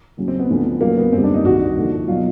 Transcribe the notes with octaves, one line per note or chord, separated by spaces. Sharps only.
D#2 C#3 F#3
C4
B3
D2 D3 F3
D#2 C#3 F#3 A#3
B3
F#2 D3 G3 C4
D4
D#4
C2 C3 D#3 F#4
D#2 D3 F3
B2 F#3 F4